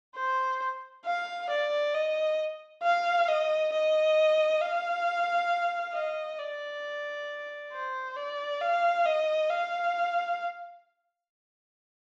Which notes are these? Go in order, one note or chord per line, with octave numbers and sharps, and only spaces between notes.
C5
F5
D5
D#5
F5
D#5
D#5
F5
D#5
D5
C5
D5
F5
D#5
F5